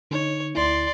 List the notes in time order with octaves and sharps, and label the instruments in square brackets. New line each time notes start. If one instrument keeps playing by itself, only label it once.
[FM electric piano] D3 D#4 [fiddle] C#5
[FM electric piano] D2 E4 [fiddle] D5 C6